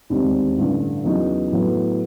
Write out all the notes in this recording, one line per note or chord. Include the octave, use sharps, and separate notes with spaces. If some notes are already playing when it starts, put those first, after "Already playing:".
E1 D#2 D#3 G3 C4
A1 G2 D3
E2 C#3 F#3 B3 D#4
A2 F#3 B3